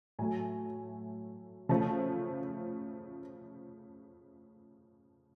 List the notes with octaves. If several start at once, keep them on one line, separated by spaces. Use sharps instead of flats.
A2 F#3 A3 G#5
C#3 F3 A3 A5